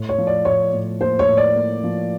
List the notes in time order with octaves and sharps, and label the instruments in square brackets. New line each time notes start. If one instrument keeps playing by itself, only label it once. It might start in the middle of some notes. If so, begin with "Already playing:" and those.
Already playing: [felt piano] A2
[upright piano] C#5
[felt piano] F3
[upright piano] D5
[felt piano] A2 [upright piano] C#5
[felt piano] A2
[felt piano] A#3 [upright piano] C5
[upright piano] C#5
[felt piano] A2
[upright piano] D5
[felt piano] A#3
F3